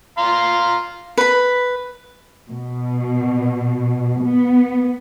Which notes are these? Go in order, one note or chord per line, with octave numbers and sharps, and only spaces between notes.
F5 A#5 C6
B4 B5
B2
B3